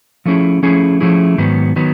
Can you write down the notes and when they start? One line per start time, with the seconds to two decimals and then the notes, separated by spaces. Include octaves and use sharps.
0.25 F3 A3 C#4 E4 G#4
0.63 F3 A3 C#4 E4 G#4
1.01 F3 A3 C#4 E4 G#4
1.38 G#2 D#3 F#3 B3
1.76 D#3 F#3 B3